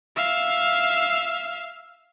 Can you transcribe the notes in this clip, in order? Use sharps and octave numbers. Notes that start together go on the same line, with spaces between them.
E5 F5